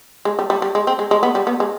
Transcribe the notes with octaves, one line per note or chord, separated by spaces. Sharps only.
G#3
G3
G3
G3
G#3
C4
G#3
G#3
B3
G3
B3
G#3